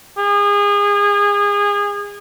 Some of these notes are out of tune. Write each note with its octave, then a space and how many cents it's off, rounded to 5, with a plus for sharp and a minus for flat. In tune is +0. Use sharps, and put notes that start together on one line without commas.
G#4 -30